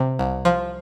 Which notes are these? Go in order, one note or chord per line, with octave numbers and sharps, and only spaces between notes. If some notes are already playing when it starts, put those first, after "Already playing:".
Already playing: C3
C2
F3